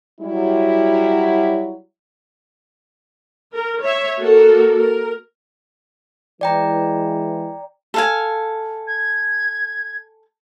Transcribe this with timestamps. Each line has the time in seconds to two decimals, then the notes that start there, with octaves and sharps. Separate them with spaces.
0.20 F#3 G3 E4
3.52 A#4
3.81 C#5 E5
4.18 A#3 F#4 A4 A#4
4.77 A#4
6.41 E3 G#3 D5 G5 A#5
7.94 A4 F5 G#5
8.87 G#6